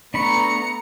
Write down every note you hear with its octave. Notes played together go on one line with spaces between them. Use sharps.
A3 B3 D4 A#5 B5 C#6 C#7